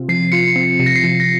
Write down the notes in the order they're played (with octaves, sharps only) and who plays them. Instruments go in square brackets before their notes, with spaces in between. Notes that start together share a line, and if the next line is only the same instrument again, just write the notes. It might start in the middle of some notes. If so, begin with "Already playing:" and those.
Already playing: [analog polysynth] C3 C4 F4
[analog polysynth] F3 [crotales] C7
[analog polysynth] F4 [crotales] C#7
[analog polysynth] C4
[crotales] C7
[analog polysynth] C3
[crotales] A#6
C7
[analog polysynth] F3
[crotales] A#6